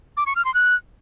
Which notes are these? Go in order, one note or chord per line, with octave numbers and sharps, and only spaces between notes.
D6
C#6
F6
C6
F#6